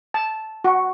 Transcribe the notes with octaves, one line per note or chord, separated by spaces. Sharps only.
A5
F#4